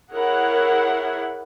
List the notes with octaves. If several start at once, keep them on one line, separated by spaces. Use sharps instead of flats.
E4 G#4 A#4 C#5 F#5